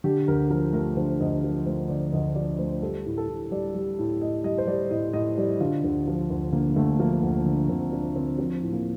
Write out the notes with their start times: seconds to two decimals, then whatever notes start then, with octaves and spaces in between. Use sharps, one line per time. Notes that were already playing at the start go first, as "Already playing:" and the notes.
0.04 D3 G4
0.28 D2 A#4
0.50 F3 A#4
0.73 A3 A#4
0.97 D3 C5
1.21 D2 D#5
1.44 F3
1.66 A3 C5
1.89 D3 D5
2.12 D2 D#5
2.35 F3 D5
2.59 A3 C5
2.82 G3 A4
3.06 A2
3.18 A4
3.28 A2
3.51 G3 D5
3.74 G3
3.99 A2
4.21 A2 D#5
4.44 G3 D#5
4.58 C5
4.67 G3 D5
4.90 A2 D#5
5.13 A2 D#5
5.38 G3 D5
5.60 D3 F4
5.84 D2
6.07 F3
6.30 D2
6.53 D3 A#3
6.76 D2 A3
6.99 F3 A#3
7.23 D2
7.46 D3
7.69 D2 C4
7.92 F3 D4
8.16 D2 C4
8.38 F3 C4
8.62 A2
8.73 A#3